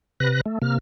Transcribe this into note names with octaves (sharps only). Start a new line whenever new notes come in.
C3 B4 F#6 A#6
A3
C3 A#3 F6